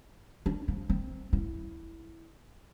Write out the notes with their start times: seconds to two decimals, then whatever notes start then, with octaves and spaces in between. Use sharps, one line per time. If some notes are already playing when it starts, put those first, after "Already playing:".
0.46 D4
0.68 F3
0.90 C4
1.33 E4